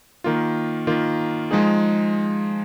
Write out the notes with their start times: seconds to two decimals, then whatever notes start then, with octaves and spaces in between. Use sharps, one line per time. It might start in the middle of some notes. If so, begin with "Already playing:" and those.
0.24 D#3 A#3 F4
0.87 D#3 A#3 F4
1.51 F3 G#3 D#4 G#4